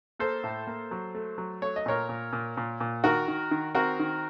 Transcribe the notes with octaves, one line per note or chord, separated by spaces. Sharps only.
A#3 A4 C5
A2
A#3
F#3
A3
F#3
A3 C#5
D#5
A#2 A#4 C#5
A#2
A#2
A#2
A#2
D#3 F#4 A#4
D#3
D#3
C4 F#4 A#4
D#3